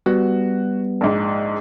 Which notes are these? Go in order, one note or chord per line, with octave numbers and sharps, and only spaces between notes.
G3 B3 F#4
A#1 G#2